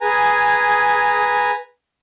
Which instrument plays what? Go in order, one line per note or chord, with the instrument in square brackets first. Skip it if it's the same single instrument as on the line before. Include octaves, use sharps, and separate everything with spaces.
[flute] G#4 [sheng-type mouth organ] B4 G#5 A#5